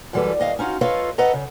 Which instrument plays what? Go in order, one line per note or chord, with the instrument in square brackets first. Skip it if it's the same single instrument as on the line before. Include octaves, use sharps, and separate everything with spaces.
[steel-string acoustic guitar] F#2 E3 G3 F#4 A4 B4
D#2 D#5 F5
C#4 D#4 F4 F#4
F4 A4 B4 C#5 D#5 F5
A4 B4 D#5 F#5 A#5
C#3